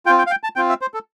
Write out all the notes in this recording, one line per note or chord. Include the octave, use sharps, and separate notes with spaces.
C4 F4 G5
G5
F5
G5
A5
C4 F4 G5
E5
C5
A4